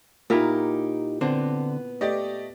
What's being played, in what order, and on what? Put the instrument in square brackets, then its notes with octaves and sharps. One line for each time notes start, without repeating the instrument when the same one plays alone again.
[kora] A#2 E4 A#4 [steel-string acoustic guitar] D#4 G4
[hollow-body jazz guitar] D3 C4 D4 [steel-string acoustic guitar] B3
[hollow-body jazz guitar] A3 [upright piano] G4 D5 D#5